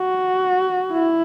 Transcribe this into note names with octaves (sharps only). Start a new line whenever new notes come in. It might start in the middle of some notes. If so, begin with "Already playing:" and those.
Already playing: F#4
E4